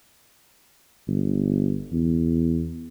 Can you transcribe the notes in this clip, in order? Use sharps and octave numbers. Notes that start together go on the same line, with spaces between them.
G1
E2